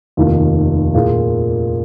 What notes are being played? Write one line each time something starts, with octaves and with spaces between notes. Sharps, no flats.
F1 D#2 D#3 A#3 F4
A#2 A#3 F4 G#4